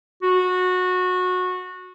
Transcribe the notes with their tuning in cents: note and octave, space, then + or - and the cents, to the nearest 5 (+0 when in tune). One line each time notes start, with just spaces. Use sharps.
F#4 -20